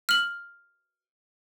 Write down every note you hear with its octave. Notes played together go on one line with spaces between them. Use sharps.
F6 F#7